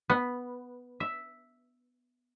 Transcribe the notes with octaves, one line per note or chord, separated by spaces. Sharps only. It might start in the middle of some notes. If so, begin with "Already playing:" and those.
B3
E5